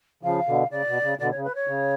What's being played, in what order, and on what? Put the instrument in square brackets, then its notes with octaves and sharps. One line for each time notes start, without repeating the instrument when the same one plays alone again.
[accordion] C#3 F3 [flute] F5
[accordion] B2 D3
[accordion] C#3 [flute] D5
[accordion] B2
C#3
[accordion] B2 D3 [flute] D5
[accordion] C#3 [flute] C#5
[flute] B4
C#5
[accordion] C#3